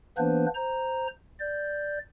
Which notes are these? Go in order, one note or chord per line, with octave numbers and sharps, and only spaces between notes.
E3 A#3 B3 D4 B4 C5
C5 A#5
D5 G6